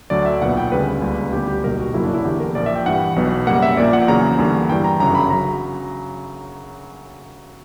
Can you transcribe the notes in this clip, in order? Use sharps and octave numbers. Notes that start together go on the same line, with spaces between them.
D2 D3 F#3 D5
E5
B1 A#2 F#3 B3 F#5
G5
D2 C#3 G3 B4
C#2 C#3 G3 A#3
D2 D3 G3 B3 G4
G4
B1 B2 G3 A#3 A#4
F#4
G1 F#2 C#3 F#3 A#3 E4
D4
E4
E2 D3 A#3 G4
A#4
A#1 A#2 A#3 D5
E5
G5
G2 E3 G3 F#5
B1 B2 F#3 B3
F#2 C#3 G3 A#3 F#5
E5
A#1 A#2 A#3 D5
F#5
E2 C#3 F#3 A#3 A#5
E2 D3 G3 A#3
G2 E3 G3 G5
A#5
G1 F#2 C#3 F#3 A#5
B5
C#3 F#3 A#5